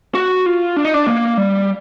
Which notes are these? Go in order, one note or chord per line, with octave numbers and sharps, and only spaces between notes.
F#4
F4
D4
D#4
D4
A#3
G3